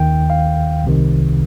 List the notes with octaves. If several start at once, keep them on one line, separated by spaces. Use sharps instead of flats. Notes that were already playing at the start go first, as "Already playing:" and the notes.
Already playing: D#2 D#3 G5
F5
C2 C3 D#3